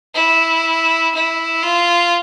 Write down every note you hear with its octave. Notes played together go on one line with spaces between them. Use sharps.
E4
E4
F4